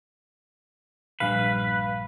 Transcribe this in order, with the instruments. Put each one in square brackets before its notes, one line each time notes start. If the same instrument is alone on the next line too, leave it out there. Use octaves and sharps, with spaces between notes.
[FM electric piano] A#1 G2 F5 [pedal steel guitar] B4